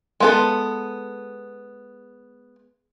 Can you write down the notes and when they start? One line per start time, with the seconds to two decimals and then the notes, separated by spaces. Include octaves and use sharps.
0.20 G#3 B3 A4